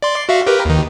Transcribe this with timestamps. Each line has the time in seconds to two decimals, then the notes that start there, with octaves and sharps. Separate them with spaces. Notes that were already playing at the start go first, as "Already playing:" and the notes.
0.02 D5 C6
0.29 F#4 E5 F5
0.46 G4 A#4 B4
0.65 D#2 D#3